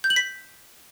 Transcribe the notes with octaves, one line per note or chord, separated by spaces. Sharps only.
G6
F#7
B6